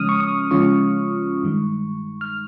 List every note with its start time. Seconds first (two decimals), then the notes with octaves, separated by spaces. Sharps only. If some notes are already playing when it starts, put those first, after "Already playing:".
Already playing: C#3 F3 G#3 C#4 D#6 F6
0.09 C#6
0.20 D#6
0.51 C#3 F3 G#3 C#4 F4 C#6
1.43 G2 D#3 G#3
2.21 F6